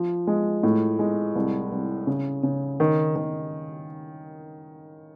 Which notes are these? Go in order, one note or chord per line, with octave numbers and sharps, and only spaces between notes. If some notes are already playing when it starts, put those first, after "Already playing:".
Already playing: F3
G#3
A2
G#3
C2
C2
C#3
C#3
D#3
D#3